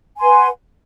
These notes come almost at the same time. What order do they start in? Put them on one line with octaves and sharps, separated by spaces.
G#5 C6 B4 F#5